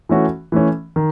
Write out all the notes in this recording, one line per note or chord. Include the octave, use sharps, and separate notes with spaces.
E3 A3 C#4 F#4
E3 A3 C#4
D#3